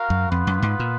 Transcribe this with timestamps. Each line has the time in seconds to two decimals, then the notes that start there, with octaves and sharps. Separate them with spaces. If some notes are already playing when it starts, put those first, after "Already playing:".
Already playing: F#4 A#4 F5
0.10 F#2
0.31 F2 B3 F4 B4
0.47 F#2
0.62 G#2
0.80 A#2